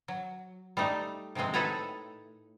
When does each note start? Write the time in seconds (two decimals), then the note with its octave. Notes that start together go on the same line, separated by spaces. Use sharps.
0.08 F#3
0.77 G3 A3 D#4
1.35 C3 D#3 F3 G#3 C4
1.54 A2 D#4 A4 B4 G#5 A#5